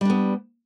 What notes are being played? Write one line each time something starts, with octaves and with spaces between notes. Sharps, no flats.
G3 B3 D4